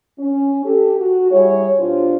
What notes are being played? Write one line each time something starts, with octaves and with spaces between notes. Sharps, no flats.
C#4
G4 A4
F#4
G3 E4 G#4 C#5
B2 D4 F4 G4 C5 C#5